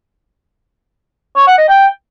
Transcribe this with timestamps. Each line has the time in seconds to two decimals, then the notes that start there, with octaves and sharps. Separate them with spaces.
1.36 C#5
1.47 F#5
1.58 D#5
1.69 G5